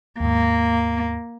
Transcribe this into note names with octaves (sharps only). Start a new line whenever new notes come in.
D#2 G#2 A#3